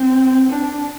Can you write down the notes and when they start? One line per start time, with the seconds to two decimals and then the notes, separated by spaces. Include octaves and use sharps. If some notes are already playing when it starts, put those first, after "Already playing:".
Already playing: C4
0.50 D4